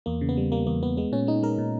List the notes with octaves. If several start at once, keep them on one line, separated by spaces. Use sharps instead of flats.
E2 A#3
C#3
B3
G3
G3 A#3
E2 A#3
E2 B3
G#3 B3
A#2 C#4
G#3 D#4
G#3 A#4
A#2